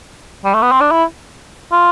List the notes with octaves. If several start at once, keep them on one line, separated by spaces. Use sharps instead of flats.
G3
A3
B3
C4
D4
E4
F4